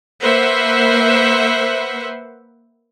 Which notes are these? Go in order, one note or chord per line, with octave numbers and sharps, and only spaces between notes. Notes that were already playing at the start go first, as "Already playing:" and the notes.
A#3 B4 C5 E5 F#5